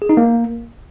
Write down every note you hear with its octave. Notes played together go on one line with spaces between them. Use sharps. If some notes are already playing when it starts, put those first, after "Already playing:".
G#4
D#4
A#3